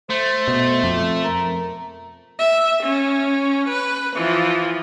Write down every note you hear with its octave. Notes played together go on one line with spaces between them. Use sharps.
A3 C5
B2
F2
A#4
E5
C#4
B4
E3 F3